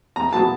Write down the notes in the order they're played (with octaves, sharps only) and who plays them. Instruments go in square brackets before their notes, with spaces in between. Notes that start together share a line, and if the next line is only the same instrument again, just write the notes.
[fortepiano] E2 A#5
B2 F#3 B3 A5